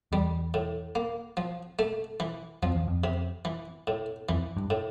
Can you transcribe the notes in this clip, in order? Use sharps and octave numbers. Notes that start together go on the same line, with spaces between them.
E2 G3
A2
A#3
F3
A3
E3
F2 F3
E2
F2
C3
E3
A2
F2 E3
G2
A2